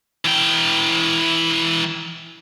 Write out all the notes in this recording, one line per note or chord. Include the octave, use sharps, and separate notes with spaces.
E3 G5